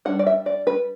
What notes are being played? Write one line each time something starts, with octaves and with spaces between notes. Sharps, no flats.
G3 D4 F#5
D5
E5
D5
B4